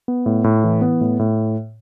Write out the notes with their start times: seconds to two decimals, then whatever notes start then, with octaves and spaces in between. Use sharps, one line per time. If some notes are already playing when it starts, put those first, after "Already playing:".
0.08 B3
0.26 A2
0.44 A2
0.64 E3
0.81 B3
1.01 A2
1.19 A2